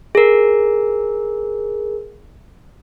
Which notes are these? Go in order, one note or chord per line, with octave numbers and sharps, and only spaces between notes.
G#4 A#4